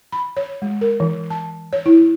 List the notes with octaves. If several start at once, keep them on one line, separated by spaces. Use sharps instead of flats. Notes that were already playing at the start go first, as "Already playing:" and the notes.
B5
C#5
G#3
A#4
E3
A5
C#5
E4